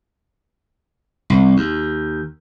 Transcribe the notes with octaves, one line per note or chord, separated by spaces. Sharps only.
C2
D#2